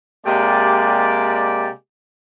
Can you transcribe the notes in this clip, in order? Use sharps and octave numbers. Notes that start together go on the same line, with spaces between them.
C3 G#3 A#3 G4 D5